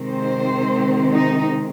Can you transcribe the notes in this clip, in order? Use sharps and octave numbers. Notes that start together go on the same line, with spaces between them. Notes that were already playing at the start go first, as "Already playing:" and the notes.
Already playing: C3 D#3 G#3 C4
C5
D#4